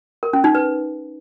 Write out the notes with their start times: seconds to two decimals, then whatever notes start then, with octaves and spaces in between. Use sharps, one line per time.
0.23 A#4
0.33 C#4
0.44 D#4
0.55 B4